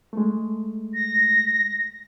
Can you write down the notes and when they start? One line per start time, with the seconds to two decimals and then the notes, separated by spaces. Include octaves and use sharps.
0.13 G#3 A3
0.94 A#6